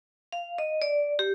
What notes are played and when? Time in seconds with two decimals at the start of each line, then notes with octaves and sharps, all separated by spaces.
0.32 F5
0.58 D#5
0.82 D5
1.19 G4